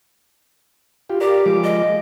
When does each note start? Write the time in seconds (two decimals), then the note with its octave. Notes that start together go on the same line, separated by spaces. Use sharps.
1.09 F4 G4
1.21 G4 A#4 D5
1.46 F3 G#3 D6
1.63 D#5